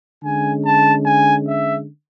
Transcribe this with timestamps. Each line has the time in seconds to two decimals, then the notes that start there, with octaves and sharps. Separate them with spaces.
0.22 D3 G#3 C#4 G#5
0.63 A5
1.04 G#5
1.45 E5